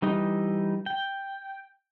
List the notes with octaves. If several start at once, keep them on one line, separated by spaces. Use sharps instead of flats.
E3 G3 D#4
G5